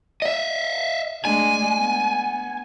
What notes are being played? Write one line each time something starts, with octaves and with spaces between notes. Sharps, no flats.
D#5 E5
G#3 A3 D4 G#5
B3